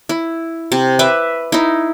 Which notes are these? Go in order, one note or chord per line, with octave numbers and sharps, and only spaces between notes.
E4
C3
B4 E5 D6
D#4 E4